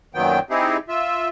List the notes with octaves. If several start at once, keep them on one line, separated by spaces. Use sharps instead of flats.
F#2 A#2 D#3 F#3 B3 G5
C4 D#4 E4 G4 G#4
F4 E5